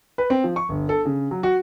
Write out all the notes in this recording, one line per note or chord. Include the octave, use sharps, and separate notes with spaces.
B4
C4
F3
C#6
G1
A4
C#3
F#3
F#4